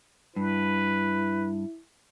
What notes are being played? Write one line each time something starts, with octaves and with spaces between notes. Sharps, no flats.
G2 E4 B4